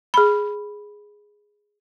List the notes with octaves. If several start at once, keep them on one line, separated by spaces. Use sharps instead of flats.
G#4 B5